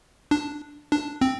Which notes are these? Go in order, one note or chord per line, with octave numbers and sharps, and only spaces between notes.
D4
D4
C4